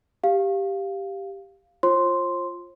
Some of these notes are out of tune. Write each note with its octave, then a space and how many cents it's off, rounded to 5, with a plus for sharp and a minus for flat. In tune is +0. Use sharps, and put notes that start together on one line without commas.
G4 +0 F5 +0
F4 +0 C5 +40 C6 -5